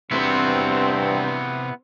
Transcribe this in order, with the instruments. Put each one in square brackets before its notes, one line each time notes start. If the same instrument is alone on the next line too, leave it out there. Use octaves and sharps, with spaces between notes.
[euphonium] G2 [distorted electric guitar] C3 F#4 [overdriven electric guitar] B3 E4 [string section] C4